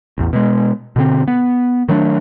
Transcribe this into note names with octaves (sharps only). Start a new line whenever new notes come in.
A1 E2
B2 G#3
B2 D3 C4
B3
D#3 F#3 A3 D4